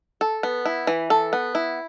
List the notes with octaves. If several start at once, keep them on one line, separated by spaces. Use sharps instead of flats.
A4
B3
E4
E3
A4
B3
E4